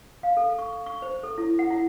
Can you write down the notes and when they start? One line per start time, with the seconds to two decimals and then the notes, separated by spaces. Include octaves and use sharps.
0.23 F5
0.37 A4
0.59 C#6
0.86 C#6
1.02 C5
1.23 A4
1.38 E4
1.59 F#5
1.70 E4